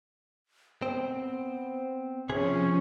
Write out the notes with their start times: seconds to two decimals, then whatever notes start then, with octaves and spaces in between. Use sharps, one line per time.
0.82 B3 C4
2.29 C3 F3 C#4 G#4